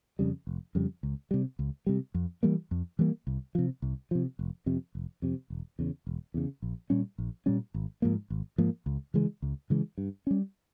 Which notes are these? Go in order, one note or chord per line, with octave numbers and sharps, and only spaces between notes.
F2 C#3 G3
F1
F2 C#3 G3
C#2
C3 G3
C#2
C3 G3
F2
E3 G3 A#3
F2
E3 G3 A#3
C2
C3 F3
C2
C3 F3
F1
F2 C3
F1
F2 C3
E1
E2 C#3
E1
E2 C#3
A#1
A#2 G3 C#4
A#1
A#2 G3 C#4
G#1
G#2 F3 A#3
G#1
G#2 F3 A#3
C#2
C#3 E3 G#3
C#2
C#3 E3 G#3
G2
G3 C#4